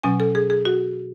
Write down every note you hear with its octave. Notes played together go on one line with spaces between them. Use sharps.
B2 F#3 C#4 G#5
A4
G#4
G#4
F#4